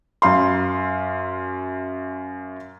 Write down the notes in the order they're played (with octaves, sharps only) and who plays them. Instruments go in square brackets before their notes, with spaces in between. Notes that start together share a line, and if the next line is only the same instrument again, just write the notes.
[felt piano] F#2 F5 C6